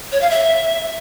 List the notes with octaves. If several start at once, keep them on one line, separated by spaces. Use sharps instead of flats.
C#5
F5
E5